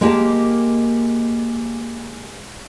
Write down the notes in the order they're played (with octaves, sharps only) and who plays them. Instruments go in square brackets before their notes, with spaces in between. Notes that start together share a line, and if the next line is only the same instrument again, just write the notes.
[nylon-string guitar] G#3 A#3 G4 A#4 A5